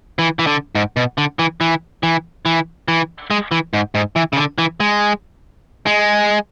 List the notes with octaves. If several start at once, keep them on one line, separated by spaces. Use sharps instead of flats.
E3
E3
D3
G#2
B2
D3
E3
E3
E3
E3
E3
G#3
E3
G#2
G#2
E3
C#3
D3
E3
G#3
G#3